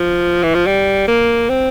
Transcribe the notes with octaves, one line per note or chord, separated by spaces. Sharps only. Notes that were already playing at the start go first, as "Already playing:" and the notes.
Already playing: F3
E3
F3
G3
A#3
C4